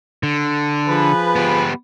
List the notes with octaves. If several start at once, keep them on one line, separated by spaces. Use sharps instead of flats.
D3
F3 G#4 B4
B3 G4